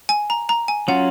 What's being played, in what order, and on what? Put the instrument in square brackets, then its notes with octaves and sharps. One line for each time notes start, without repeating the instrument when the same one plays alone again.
[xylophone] G#5
A#5
A#5
G#5
[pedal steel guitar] F#3 C#4 F4 [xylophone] F#5